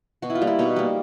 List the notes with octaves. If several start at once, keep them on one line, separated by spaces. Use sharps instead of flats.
B2 F#4
E4
F4
G3 A#3
E4
B2 D#4
G3 A#3